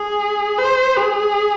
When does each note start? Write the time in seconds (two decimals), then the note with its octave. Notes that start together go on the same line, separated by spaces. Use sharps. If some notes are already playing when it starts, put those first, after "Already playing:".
Already playing: G#4
0.59 C5
0.97 G#4